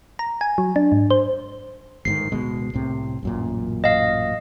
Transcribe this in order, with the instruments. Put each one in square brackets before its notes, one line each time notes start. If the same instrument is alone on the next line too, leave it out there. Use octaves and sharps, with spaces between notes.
[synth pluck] A#5
G#5
F#3
D4
G#2
C5
[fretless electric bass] G1 G#2 D#3 [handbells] C7
[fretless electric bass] D1 B2 G#3
C2 A2 C3
A1 F#2 A#2
[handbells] D#5 F5